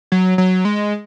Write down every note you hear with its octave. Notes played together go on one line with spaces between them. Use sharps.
F#3
F#3
G#3